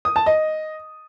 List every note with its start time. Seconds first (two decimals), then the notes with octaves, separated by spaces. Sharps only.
0.05 D#6
0.16 A5
0.26 D#5